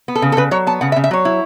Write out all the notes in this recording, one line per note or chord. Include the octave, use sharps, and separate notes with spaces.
B3
A4
C#3
A4
C#3 B4
F#3 C#5
B3 A5
C#3 F#5
E5
C#3
E5
F#3 C#5
E4